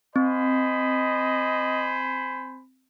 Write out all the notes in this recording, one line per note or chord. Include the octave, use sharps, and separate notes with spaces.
C4 C5 D#5 G#5 B5